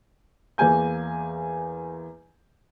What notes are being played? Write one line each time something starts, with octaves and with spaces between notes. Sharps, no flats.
E2 A#3 G#4 G#5 G6